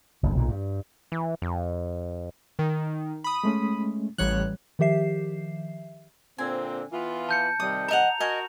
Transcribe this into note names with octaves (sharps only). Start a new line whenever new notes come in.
F#1 D2
B1 A#2 D3
G2
E3
F2
D#3
B5 D#6
G#3 A3 C#4
A1 E3 G3 C#5 F#6
D#3 F3 G4 E5 C7
A#2 D3 C4 G#5
E3 B3 F4
A5 G6 C#7
C3 D#3 G3 D#6
A#4 D#5 F#5 A#5 F7
F#4 A#4 D#5 G#5